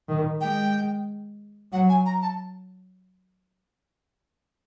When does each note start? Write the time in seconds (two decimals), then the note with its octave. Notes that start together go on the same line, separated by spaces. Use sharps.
0.09 D#3
0.41 G#3 G5
1.73 F#3 F#5
1.89 G#5
2.06 A#5
2.22 A5